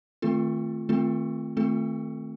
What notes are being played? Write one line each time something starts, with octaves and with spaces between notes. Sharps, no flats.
D#3 A3 C4 F4 A4
D#3 A3 C4 F4 A4
D#3 A3 C4 F4 A4